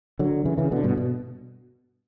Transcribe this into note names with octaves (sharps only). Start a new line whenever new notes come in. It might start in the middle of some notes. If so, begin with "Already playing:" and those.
D3 F#3
C#3 E3
C#3 E3
B2 D3
G2 B2
B2